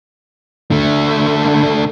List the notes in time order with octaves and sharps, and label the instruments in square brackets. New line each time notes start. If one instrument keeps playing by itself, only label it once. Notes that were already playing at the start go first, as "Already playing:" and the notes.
[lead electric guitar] D3 A3